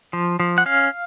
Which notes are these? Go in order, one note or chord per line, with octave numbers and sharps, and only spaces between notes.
F3
F3
F#5
C#4 F5